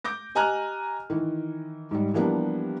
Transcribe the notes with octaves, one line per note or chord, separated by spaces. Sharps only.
D6 G6 A#6
G4 D#5 G#5 A#5 F6 F#6
D#3 E3
G#2 G3
E3 F3 G3 A#3 B3 D4